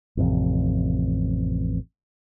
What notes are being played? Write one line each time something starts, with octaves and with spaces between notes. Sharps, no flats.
A1 F2 C3